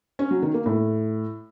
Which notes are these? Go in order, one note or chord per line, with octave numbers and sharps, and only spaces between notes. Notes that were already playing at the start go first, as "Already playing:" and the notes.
C#4
F#3
D#3
A#3
A2